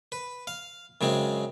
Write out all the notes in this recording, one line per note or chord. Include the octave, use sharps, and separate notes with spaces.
B4
F5
F#2 C#3 G#3 C4